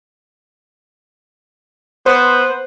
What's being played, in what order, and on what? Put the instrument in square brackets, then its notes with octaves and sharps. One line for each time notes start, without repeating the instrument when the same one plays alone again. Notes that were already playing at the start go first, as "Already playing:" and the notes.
[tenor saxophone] B3 [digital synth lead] C5